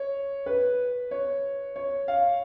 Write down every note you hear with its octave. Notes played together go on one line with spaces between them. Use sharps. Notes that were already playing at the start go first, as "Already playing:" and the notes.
Already playing: C#5
B4
C#5
C#5
F5